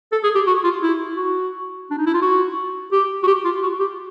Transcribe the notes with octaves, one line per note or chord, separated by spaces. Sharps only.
A4
G#4
G4
F#4
F4
E4
F#4
D4
D#4
E4
F4
F#4
G4
F#4
G4
F4
F#4
G4